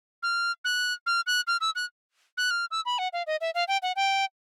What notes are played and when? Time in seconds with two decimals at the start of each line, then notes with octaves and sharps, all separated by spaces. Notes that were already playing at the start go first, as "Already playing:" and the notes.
0.23 F6
0.65 F#6
1.06 F6
1.27 F#6
1.47 F6
1.61 E6
1.76 F#6
2.37 F#6
2.51 F6
2.71 E6
2.86 B5
2.99 F#5
3.13 F5
3.27 D#5
3.41 E5
3.55 F5
3.68 G5
3.82 F#5
3.96 G5